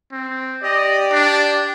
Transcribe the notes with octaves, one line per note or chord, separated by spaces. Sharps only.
C4
G4 D5 D#5
D4